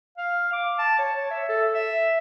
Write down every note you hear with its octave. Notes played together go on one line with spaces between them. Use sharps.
F5
D6
A5
C#5
E5
A4
E5